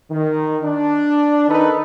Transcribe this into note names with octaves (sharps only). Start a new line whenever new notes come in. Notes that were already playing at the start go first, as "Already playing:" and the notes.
D#3
D4
D#3 D#4 A4 B4